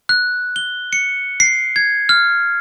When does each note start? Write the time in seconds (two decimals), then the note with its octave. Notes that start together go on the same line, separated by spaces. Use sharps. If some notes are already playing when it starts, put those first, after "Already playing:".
0.09 F#6
0.56 G7
0.93 C#7
1.40 C7
1.76 G#6
2.09 F6